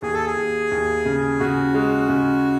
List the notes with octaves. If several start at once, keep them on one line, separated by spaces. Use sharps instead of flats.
D#2 G#4
A4
G#4
D#2
D#2
C#3
C#3 F#4
G#3
C#3